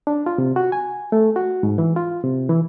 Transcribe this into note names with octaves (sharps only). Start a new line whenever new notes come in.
D4
F4
C3
F#4
G#5
A3
F#4
G#2
E3
F4
C3
E3